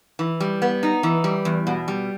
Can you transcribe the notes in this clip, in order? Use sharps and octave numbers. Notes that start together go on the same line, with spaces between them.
E3
G3
B3
D#4
E3
G3
E2
B2
G3